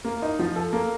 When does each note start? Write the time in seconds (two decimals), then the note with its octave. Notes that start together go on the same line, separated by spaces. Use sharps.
0.05 A#3
0.22 D#4
0.39 F3
0.56 A4
0.73 A#3